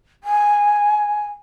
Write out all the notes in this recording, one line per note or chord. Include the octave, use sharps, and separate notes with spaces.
G#5